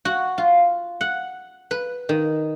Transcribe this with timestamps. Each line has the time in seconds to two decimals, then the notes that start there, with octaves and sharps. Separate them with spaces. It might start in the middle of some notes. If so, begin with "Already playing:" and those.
0.05 F#4
0.38 F4
1.01 F#5
1.71 B4
2.09 D#3